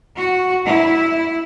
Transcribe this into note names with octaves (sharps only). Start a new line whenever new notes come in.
F#4
E4